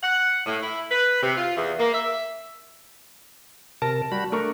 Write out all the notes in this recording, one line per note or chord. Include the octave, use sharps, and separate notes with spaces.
F#5
A2
E4
B4
C3
F4
E2
A#3
E5
C3 A#4 A5
G3 F#4 B5
A3 D4 A#4 C#6